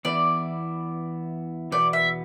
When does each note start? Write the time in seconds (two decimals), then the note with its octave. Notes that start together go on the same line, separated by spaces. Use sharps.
0.05 E2 E3 B3 E4 D5
1.72 E2 B2 B3 D5
1.93 E5